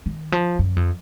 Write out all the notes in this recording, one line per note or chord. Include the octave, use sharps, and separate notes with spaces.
D#3
F3
F#2
F2